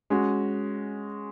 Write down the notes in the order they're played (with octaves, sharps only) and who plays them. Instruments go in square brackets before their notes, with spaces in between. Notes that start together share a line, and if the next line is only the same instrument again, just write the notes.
[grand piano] G#3 C#4 F#4